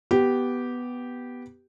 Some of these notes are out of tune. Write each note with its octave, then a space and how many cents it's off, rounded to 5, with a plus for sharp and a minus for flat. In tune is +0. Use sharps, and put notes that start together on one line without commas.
B3 +0 G4 -10